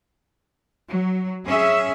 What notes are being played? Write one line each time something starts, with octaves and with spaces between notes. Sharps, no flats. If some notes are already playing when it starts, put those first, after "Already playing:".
F#3
C#4 G#4 E5